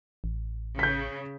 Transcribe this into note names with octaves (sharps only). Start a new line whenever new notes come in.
A1
C#3 G6 B6